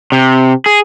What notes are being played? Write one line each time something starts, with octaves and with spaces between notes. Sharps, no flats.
C3
G#4